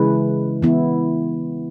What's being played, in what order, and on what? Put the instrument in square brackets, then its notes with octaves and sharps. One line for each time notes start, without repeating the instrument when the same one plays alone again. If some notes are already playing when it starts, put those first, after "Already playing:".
Already playing: [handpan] C#3 E3 G#3 E4 B4
E3 B3 E4